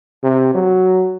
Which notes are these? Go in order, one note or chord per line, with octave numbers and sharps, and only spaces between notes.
C3
F#3